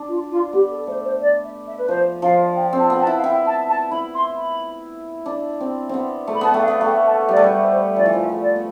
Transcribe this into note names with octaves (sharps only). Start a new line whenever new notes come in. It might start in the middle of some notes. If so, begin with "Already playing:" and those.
Already playing: D4
F4
F4
B3 G4
A4
A3 C5
C5
D5
E5
E5
B4
F3 C5
F3 F5
G5
C4
A5
B3 G5
A5
E4
F5
E4 G5
A5
A5
E4 B5
C6
B5
D4
C4
B3 C4
A3
B5
B3 A5
A3 G5
F5
B3
F5
A3 G5
A5
G3 D5
A3
G3
C5
F3 D5
E3
F3
E5
A3
D5
B3